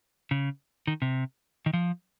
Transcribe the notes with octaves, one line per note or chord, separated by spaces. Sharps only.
C#3
D#3
C3
D#3
F3